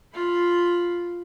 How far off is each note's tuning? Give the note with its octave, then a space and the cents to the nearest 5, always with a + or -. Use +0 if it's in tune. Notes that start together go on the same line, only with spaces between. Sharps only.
F4 +0 B5 +0